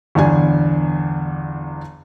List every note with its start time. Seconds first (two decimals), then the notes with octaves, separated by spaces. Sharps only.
0.15 G1 E2 D4 G#5